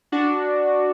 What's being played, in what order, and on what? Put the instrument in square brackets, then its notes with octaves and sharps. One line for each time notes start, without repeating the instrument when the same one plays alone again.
[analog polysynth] D4 F#4